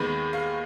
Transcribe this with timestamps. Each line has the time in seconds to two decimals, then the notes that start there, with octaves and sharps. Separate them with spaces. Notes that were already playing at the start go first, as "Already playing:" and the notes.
Already playing: D#2 D#3 G#3 B3 B5
0.33 F5